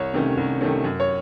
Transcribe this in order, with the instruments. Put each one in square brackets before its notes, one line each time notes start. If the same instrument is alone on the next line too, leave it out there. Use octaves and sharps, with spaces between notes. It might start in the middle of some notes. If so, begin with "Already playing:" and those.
Already playing: [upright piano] C2 C#5
C3 D#3 A3 C#4
C2
C3 D#3 A3 C#4
F#2
C#5